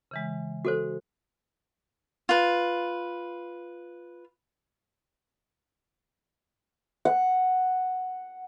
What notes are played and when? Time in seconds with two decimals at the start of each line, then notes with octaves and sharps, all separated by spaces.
0.11 C#3 E3 G#3
0.65 F#4 A4 C5
2.29 F4 B4
7.05 F#5